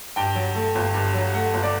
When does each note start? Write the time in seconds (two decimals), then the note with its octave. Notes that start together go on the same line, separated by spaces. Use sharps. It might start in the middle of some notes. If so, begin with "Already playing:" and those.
0.16 G2 G5
0.35 F#3
0.55 A3
0.75 G1
0.94 G2
1.14 F#3
1.34 A3 F#5
1.54 G1
1.63 D5